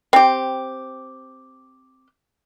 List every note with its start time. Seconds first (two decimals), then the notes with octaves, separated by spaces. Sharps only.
0.13 C4 G4